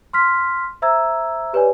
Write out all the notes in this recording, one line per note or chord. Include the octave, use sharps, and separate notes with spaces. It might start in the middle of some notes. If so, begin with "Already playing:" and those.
C6 F6 B6
C5 E5 A#5 E6 G#6
G4 B4 C#5 D5 G#5